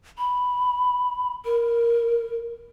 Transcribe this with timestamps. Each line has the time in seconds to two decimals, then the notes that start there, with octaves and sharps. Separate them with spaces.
0.18 B5
1.45 A#4